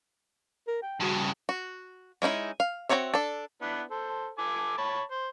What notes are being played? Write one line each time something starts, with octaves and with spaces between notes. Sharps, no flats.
A#4
G5
G2 C#3 F#4
F#4
G#3 C#4 D#4 E4
F5
C4 E4 F#4 C#5 E5
D4 A4
B3 D4 E4
A4 C5
A4 G#5 D6
C#5 A5 B5
C5